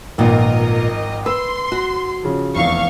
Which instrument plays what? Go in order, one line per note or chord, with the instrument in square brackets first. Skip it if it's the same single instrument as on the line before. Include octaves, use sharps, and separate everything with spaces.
[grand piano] G#1 F3 [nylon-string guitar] A#2 B3 [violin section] A#4 D#5
[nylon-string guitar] B4 [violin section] C6 [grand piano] E6
[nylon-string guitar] F#4
[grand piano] C#3 F3
[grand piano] F1 E2 [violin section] F5 C#6